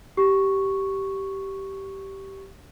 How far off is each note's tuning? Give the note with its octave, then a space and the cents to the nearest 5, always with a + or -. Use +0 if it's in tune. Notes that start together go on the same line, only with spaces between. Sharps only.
G4 -10 C#6 +0